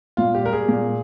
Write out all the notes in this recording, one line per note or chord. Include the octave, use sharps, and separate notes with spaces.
A#2 F4
G4
G3 A#4
G#4
A#2